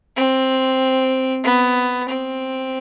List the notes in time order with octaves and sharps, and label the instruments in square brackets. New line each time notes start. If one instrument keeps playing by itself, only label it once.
[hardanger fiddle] C4
B3
C4